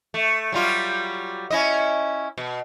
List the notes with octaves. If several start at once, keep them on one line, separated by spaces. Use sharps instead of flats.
A3
F#3 G3 F4
C#4 E4 D#5
B2